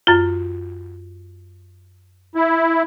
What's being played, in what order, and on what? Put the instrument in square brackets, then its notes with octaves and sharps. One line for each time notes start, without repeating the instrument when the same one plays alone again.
[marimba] F#2 F4
[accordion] E4